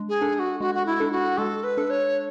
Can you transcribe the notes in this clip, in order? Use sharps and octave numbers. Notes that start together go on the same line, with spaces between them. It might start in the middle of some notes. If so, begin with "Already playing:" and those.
Already playing: G#3 D4
G#4
D4 A4
G#4
F#4
G#3 F#4
F#4
E4
D4 A4
F#4
G#3 A4
B4
D4 A4
C#5